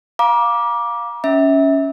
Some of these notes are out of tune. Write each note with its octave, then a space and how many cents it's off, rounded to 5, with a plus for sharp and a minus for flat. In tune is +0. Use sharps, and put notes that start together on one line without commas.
F5 +10 A#5 +35 D6 +0
C#4 +10 E5 -25